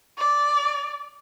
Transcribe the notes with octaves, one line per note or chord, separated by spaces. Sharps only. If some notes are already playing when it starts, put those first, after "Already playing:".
D5